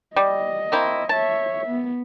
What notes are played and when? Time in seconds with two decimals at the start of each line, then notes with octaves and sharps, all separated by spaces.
0.16 G3 D#5
0.72 A#3 C4 E4
1.09 C#5 E5 A5
1.67 B3